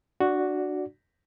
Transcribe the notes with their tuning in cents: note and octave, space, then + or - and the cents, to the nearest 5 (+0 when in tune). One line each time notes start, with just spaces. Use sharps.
D4 +20 F#4 +0 D5 -10